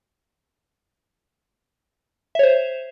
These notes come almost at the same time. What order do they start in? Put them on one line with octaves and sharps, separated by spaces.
E5 C#5 C5